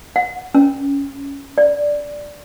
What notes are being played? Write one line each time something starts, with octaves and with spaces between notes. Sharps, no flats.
F#5
C#4
D5